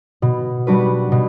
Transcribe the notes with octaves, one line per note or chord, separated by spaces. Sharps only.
B2
G3 D4 F#4 B4
B2